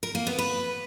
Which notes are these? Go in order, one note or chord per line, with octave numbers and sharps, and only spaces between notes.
A#4
A#3
B3
B4